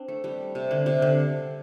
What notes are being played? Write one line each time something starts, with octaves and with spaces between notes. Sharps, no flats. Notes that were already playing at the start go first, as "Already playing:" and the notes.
Already playing: C4 D4
A3
G3
C3
D3
C3
D3